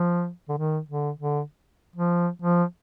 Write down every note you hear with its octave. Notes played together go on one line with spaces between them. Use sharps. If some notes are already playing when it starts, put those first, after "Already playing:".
Already playing: F3
D3
D#3
D3
D3
F3
F3